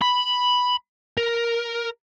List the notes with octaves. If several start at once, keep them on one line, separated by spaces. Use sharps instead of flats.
B5
A#4